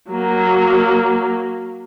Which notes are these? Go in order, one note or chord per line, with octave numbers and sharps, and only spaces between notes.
F#3 A#3